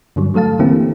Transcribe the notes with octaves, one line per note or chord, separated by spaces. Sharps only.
G2 D3 F#3 G3
F#3 A3 A4 F5 A5
D3 E3 A#3 C4 E4 G4